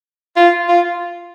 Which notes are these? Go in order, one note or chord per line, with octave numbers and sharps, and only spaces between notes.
F4
F4